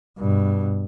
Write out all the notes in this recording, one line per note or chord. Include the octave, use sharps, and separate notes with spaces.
G2 B2